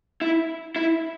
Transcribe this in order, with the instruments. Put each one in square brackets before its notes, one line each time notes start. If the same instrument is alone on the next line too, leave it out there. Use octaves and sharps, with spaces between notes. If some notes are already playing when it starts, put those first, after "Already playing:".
[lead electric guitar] E4
E4